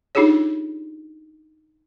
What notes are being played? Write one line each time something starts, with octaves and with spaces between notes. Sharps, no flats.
D4 D#4 F4 G4 G#4 C#5